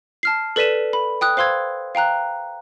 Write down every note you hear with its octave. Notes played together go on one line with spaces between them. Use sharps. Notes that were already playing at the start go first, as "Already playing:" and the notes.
A5 F6 C7
A4 B4 D5 B6 D#7 E7
B5
G5 D#6 F#6
C5 F5 C6 E6 G#6
F5 G5 A#5 F#6